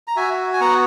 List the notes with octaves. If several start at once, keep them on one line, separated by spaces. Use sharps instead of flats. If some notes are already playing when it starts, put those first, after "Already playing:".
A#5
F#4 E5 G#5
G#5
B3 F#5 A#5